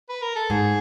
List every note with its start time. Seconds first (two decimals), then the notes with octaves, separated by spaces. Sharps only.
0.09 B4
0.22 A#4
0.36 A4
0.50 G#2 G#4